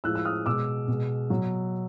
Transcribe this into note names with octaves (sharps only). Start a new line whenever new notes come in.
A2 F3 G#3 E6 F#6
E6
D#6 F6
B2 G#3 D6 E6
B2 G#3
B2 F#3